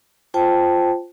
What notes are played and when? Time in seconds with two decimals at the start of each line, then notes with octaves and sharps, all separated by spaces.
0.34 F4 C5 G5 A5